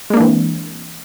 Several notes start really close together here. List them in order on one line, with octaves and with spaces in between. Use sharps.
G#3 A#3 D4 E3 C4